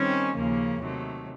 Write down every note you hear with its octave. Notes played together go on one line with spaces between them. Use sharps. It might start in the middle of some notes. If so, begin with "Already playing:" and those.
Already playing: D#3 G3 C4 C#4 D#4
D#2 C#3 F3 A#3 C#4
C3 D#3 F#3 A3